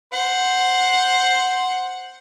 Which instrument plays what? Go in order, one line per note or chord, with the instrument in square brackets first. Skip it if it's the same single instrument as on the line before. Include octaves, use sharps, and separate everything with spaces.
[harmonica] C5 [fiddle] F#5